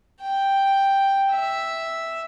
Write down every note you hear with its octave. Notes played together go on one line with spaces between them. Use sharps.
G5
E5